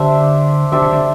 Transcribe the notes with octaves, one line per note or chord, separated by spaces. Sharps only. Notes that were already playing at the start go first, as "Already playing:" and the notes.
Already playing: D3 D4 G4 C5 E5
D3 D4 G4 C5 E5
C3
D3